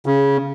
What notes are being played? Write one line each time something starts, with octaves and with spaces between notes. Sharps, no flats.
C#3